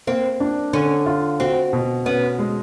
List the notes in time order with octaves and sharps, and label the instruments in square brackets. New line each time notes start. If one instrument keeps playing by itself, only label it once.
[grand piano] A#3 [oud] C4
[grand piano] D4
[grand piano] D3 [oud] C#4
[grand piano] F4
[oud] C4 [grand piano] F#4
[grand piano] B2
[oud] B3 [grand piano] C#4
[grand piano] G#3